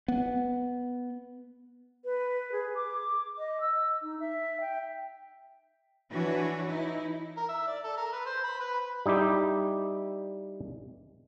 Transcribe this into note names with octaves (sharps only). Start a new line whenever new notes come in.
B3
B4
G#4
D6
D#5
E6
D#4
E5
G5
E3 D4 F#4 B4 C#5
D#4 E4
A#4
E5
D5
A4
A#4
B4
C5
B5
B4
G3 D#4 E4 G4